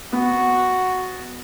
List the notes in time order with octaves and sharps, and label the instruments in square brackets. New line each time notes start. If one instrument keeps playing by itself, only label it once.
[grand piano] B3 [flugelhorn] F#4